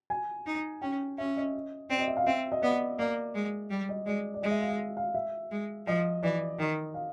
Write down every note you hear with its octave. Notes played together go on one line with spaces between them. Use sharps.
G#5
D#4
C#4 G5
C#4 E5
D#5
C4 D5
D#5
E5
F5
C4 E5
D#5
B3 D5
A#3 D5
G#3
G3
D#5
G#3 D5
D5
G#3 D#5
E5
F5
E5
F5
E5
G#3
F3 D#5
E3 D5
D#3 D#5
F5